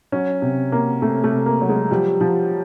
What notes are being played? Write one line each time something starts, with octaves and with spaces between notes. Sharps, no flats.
F#3 C#4
C3
C3 A#3
C3 A3
A3
C3
A#3
F#3
G#3
F3 G3
F3